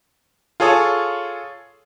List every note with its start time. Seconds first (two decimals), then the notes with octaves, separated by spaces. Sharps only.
0.60 F4 G#4 A4 C#5 D#6